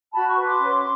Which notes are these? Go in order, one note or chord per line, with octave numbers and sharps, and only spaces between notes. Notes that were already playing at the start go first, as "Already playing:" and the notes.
F#4 A5 B5
B5 C#6
B4
C6 D6
C#4